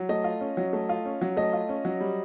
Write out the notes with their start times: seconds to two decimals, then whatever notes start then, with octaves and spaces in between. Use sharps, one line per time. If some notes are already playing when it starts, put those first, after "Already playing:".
Already playing: F#3
0.09 A3 D#5
0.24 F4
0.41 C#4
0.57 F#3
0.73 A3
0.89 F4
1.05 C#4
1.21 F#3
1.37 A3 D#5
1.53 F4
1.69 C#4
1.85 F#3
2.00 G3